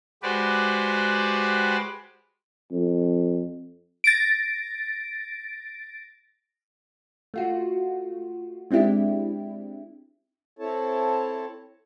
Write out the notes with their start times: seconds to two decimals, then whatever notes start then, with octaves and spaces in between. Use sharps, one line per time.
0.23 G#3 F#4 G4 B4 C5 D5
2.71 F2
4.04 A6 A#6 D7
7.34 A3 F4 F#4
8.71 G#3 C4 D4 E4 G4
10.59 C4 E4 A4 C#5 A5